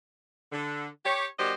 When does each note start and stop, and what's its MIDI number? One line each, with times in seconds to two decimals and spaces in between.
0.52 0.87 50
1.05 1.26 67
1.05 1.26 73
1.39 1.53 54
1.39 1.53 58
1.39 1.53 62
1.39 1.53 67
1.39 1.53 72
1.39 1.53 75